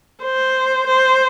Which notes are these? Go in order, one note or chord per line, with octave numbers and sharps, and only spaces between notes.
C5
C5